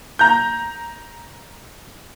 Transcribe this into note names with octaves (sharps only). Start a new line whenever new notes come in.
A#5 G6